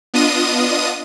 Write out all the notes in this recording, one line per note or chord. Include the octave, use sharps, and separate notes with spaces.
B3 D4 F4 D#5 D#6 D#7